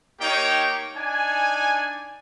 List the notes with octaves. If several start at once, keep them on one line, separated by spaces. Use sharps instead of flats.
A#3 D#4 G4 C#5 G5
D4 D#4 G#5